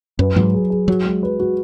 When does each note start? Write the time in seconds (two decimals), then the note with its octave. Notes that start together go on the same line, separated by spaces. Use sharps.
0.19 F#2 B4
0.36 G#2 F#3
0.54 G#4
0.70 G#4
0.88 F#3 F#4
1.05 G#3
1.23 B4
1.40 F#4